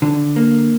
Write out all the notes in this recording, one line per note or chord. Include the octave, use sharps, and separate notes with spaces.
D3
A#3